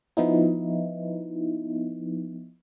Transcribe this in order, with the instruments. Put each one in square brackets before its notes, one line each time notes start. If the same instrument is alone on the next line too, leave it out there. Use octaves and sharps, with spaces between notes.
[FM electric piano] F3 B3 D#4 E4